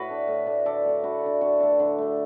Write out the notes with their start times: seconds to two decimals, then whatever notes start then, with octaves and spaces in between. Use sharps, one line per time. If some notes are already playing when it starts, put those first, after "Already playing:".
Already playing: A2 F#4 B4
0.09 A3 D4
0.28 A2
0.46 A3 D4
0.66 D3 A4 D5
0.84 A3 D4
1.03 D3 F#4 B4
1.23 A3 D4
1.41 D3 F#4
1.60 A3 D4
1.80 D3
1.98 A3 D4